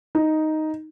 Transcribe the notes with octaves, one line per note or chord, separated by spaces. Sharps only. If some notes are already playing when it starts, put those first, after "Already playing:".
D#4